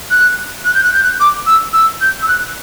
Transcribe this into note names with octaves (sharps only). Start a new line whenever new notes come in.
F#6
F#6
G6
F#6
G6
F#6
D6
E6
E6
G6
E6
F#6